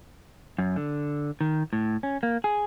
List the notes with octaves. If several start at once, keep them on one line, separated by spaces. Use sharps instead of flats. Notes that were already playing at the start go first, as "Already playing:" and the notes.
F#2
D3
D#3
A2
C#4
A#3
G#4